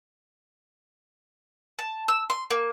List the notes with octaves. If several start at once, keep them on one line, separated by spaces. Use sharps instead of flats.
A5
E6
C6
A#3